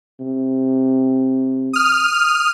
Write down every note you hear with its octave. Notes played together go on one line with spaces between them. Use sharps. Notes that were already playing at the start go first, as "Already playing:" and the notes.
C3
D#6 F6